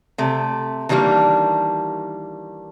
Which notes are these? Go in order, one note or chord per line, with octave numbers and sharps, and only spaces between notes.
C3 A3
D#3 E3 G3 A#3 D4